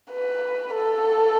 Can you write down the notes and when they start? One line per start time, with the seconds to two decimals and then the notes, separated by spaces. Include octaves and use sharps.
0.11 B4
0.75 A4